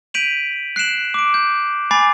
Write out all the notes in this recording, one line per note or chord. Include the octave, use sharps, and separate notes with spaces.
G6 B6 D7 D#7 F7 F#7
F#6 C7 D7 E7 F#7
D6 D7
G6
G#5 B5 D6 A6 C7